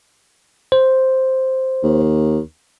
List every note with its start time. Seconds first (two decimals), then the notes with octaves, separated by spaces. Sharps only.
0.72 C5
1.83 D#2